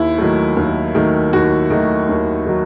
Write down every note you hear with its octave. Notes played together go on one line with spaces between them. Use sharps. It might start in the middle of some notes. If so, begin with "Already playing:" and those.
Already playing: D#2 E4
D#3 F#3 A3
D#2
D#3 F#3 A3
D#2 F#4
D#3 F#3 A3
D#2
D#3 F#3